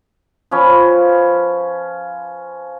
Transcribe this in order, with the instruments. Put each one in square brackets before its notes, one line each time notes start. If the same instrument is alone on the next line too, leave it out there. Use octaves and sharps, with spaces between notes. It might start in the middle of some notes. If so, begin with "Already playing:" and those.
[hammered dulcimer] F3 C#4 B4